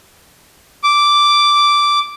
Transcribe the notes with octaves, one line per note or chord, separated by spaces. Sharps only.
D6